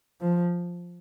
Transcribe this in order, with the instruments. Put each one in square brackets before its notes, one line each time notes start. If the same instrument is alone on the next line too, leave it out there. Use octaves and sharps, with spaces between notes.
[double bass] F3